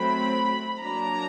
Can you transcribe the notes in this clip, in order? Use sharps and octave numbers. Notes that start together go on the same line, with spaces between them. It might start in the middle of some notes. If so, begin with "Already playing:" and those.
Already playing: F#3 A3 C4 B5
F#3 A#3 D4 A#5